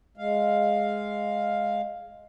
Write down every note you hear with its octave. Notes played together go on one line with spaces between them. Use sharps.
G#3 F5